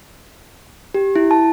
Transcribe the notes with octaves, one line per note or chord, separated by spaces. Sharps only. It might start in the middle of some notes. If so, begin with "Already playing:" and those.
G4
E4
A5